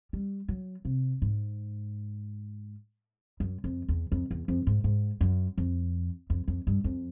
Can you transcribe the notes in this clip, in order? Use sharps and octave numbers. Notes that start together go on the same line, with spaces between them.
G3
F#3
C3
G#2
F#2
F2
E2
F2
E2
F2
G#2
G#2
F#2
F2
F2
F2
G2
F2